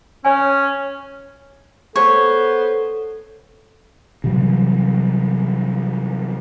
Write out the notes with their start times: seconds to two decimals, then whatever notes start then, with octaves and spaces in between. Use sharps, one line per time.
0.25 C#4 C#5 G#5
1.96 B3 A4 C5 C#5
4.24 C3 E3 F#3 G3